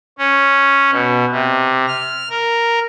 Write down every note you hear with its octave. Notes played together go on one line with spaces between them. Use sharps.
C#4
B2
C3
F6
A#4